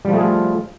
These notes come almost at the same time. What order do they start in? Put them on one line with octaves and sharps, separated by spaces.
G3 F3 A3 G#4 F4